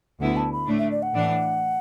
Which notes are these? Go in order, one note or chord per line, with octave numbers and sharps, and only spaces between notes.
D2 D3 B3 E4 F#5
A5
B5
A2 A3 D4
E5
D5
F#5
A2 E3 D4